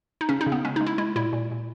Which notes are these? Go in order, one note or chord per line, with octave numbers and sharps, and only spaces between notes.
D#4
C#3 C#4
D#4
C#3
B3
G#3 C#4
D#4
G#3
E4
G#3 E4
A#2 E4
A#2
A#2